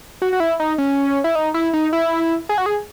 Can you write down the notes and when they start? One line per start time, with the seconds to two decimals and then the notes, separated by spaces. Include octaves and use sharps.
0.22 F#4
0.33 F#4
0.40 E4
0.60 D#4
0.78 C#4
1.24 E4
1.35 D#4
1.54 E4
1.73 D#4
1.93 E4
2.49 G#4
2.58 F#4
2.66 G#4